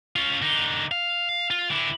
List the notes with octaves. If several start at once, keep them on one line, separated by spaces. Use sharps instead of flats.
C#4 F4
D3 D#4
F5
F4
D3 E4